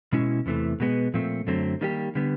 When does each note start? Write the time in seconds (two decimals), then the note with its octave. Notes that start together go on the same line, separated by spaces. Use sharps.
0.13 B2 G#3 C#4 E4
0.46 E2 C3 E3 A3
0.80 B2 G#3 B3
1.14 A#2 F3 A3 C4
1.47 F#2 D3 F#3 A3 C4
1.81 D#3 G3 A#3 D#4 G4
2.15 D3 G3 B3